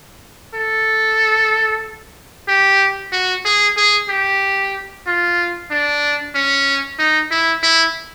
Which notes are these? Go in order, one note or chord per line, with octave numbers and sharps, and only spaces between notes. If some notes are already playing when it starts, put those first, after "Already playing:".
A4
G4
F#4
G#4
G#4
G4
F4
D4
C#4
D#4
E4
E4